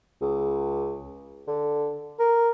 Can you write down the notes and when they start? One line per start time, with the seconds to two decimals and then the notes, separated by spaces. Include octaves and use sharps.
0.21 C#2
1.48 D3
2.19 A#4